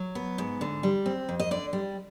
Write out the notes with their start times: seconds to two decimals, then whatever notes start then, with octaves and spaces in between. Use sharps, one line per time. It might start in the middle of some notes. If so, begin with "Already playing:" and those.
Already playing: F#3
0.15 B3
0.38 G#2
0.61 D3
0.83 G3
1.06 C4
1.29 F2
1.40 D#5
1.51 D3 D5
1.73 G3